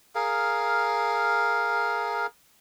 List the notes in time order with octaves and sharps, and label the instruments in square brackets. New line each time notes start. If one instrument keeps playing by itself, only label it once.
[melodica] G#4 A#4 F5